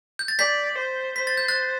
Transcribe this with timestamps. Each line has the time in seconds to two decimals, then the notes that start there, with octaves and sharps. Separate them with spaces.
0.19 G6
0.28 A6
0.38 D5 G6 B6
0.77 C5
1.16 C5 B6
1.27 A6
1.37 G6
1.48 F#6 A6